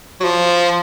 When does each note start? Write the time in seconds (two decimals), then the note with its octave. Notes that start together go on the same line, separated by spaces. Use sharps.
0.20 F#3
0.24 F3